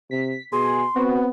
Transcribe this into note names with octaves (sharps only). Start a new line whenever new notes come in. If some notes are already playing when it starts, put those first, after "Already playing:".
C3 B6
B2 G#4 C6
B3 C4 F#4